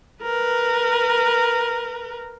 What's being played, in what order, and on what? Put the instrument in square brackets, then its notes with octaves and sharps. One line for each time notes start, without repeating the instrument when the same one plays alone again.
[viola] A#4 B4